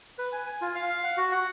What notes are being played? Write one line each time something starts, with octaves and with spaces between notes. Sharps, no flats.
B4
G#5
G#5
F4
F5
F5
F#5
F#4
F#5